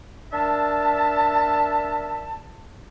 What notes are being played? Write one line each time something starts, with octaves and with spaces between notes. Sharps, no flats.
D4 A#4 E5 A5